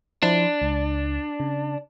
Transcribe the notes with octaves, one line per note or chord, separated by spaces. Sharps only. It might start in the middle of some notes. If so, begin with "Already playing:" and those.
F3 D4 E4 C5
C#2
C#3